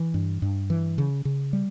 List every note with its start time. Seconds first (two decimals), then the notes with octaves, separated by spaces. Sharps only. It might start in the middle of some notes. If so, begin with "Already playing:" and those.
Already playing: E3
0.14 G2
0.42 G2
0.70 E3
0.98 C#3
1.25 C#3
1.53 G3